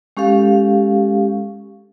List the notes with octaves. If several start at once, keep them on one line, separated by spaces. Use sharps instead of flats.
G#3 C#4 G4 A4 F5